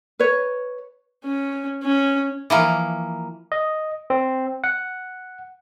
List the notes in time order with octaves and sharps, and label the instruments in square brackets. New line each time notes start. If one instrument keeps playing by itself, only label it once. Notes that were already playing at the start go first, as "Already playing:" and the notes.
[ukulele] B4 C#5
[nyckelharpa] C#4
C#4
[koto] E3 F3 A#3
[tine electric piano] D#5
C4
F#5